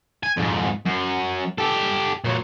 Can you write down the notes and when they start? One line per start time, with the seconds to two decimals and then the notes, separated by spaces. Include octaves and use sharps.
0.23 G#5
0.37 F2 G#2
0.86 F#2
1.58 G4 A4
2.24 A#2 F#3